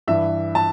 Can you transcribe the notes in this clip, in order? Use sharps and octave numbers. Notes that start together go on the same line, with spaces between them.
G2 E3 E5
A5